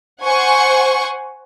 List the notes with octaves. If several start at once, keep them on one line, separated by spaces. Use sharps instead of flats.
C5 F#5 G#5 C#6